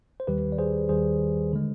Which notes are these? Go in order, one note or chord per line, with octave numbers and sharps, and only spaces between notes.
C5
D#2 D#3 G3 G4 B4
D5
G#4 C5
D#2 D#3 G3 G#4 C5
D3 G#3